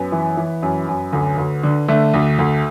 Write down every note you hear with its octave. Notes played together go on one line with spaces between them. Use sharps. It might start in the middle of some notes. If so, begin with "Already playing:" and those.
Already playing: F#2 B3
E3
E3
F#2
F#2
D2
D2
D3
D3 A3
D2
D2